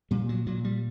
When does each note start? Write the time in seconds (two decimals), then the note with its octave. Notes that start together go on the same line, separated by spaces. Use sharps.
0.11 A#2 G3
0.29 F#3
0.47 A#2 F#3
0.64 G3